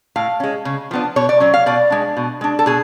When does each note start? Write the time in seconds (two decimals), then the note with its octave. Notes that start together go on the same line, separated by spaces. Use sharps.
0.16 A2 F5
0.40 G#3 C#4
0.65 C#3
0.91 F3 B3 D4
1.16 B2 C#5
1.29 D5
1.40 F#3 C#4
1.54 F5
1.66 B2 D5
1.91 G#3 D4
2.17 B2
2.41 G#3 D4
2.59 A4
2.66 B2 G#4